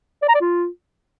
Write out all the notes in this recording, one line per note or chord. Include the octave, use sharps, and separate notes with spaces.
D5
A#5
D5
F4